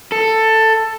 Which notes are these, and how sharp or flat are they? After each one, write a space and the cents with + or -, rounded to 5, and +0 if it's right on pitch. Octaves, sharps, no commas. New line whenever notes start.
A4 +10